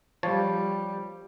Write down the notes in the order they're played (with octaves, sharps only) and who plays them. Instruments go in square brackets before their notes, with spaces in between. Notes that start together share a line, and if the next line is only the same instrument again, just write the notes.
[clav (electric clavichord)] F3 C#5 A5 [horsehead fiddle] G3